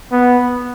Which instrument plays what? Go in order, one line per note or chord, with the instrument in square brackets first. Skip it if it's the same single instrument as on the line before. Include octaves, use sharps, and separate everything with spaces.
[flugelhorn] B3